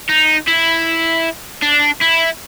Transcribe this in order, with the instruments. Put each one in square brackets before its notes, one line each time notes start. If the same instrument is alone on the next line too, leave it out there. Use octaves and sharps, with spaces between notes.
[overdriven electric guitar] D#4
E4
D4
E4